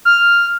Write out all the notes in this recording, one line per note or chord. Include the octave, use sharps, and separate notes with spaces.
F6